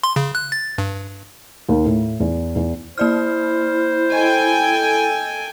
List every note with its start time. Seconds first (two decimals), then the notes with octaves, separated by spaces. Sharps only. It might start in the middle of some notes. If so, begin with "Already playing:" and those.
0.03 C6
0.16 C#3
0.35 F#6
0.52 A6
0.78 G2
1.69 D#2
1.86 A2
2.20 E2
2.56 E2
2.98 A#3 E4 C5 D5 F6
4.12 A4 D#5 G5 G#5